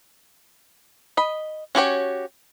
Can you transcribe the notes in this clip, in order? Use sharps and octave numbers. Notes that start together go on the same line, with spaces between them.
D#5 B5
C#4 F#4 G4 C#5